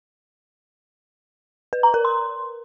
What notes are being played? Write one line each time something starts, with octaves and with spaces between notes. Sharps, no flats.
B4
A#5
A#4
C6